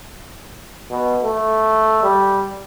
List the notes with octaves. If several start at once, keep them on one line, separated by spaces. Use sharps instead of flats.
B2
A3
G3